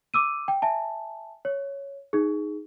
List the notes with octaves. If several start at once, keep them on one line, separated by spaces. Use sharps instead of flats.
D6 E6 D#7
G5
E5 G#5 A5
C#5
D#4 G#4